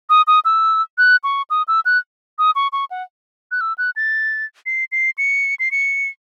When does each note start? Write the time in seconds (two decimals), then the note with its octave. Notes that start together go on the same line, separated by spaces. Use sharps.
0.10 D#6
0.27 D#6
0.45 E6
0.98 F#6
1.24 C#6
1.50 D#6
1.68 E6
1.85 F#6
2.39 D#6
2.55 C#6
2.73 C#6
2.91 F#5
3.51 F#6
3.61 E6
3.78 F#6
3.96 A6
4.66 C7
4.92 C7
5.18 C#7
5.60 C7
5.71 C#7